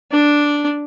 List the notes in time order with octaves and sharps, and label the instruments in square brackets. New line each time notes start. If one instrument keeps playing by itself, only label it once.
[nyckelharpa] D4